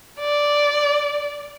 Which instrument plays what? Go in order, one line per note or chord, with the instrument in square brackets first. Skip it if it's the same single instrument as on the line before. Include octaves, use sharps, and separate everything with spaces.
[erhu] D5